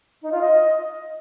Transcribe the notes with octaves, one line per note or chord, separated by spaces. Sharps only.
D#4
F4
D#5